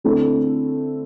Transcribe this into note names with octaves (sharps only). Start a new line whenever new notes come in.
D3 A3 C4 E4 A4